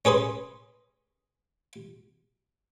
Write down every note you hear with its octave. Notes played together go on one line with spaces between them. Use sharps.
C#4 G#4 B4 C6